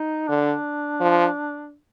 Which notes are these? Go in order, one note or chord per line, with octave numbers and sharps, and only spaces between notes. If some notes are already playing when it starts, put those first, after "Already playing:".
Already playing: D#4
D3 D4
F3